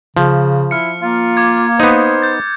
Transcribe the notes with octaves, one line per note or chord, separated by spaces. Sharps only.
C#3 F3
E4 F6 C#7
A#3 F4
D6 G#6
B3 D#4 C5
G6 A6